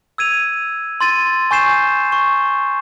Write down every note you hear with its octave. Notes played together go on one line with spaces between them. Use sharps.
E6 G#6 D#7 F7
C6 A6 D#7
G#5 C#6 G6 C7 E7
C#6